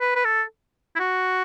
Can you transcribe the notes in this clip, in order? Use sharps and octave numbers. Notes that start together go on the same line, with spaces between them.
B4
B4
A4
E4
F#4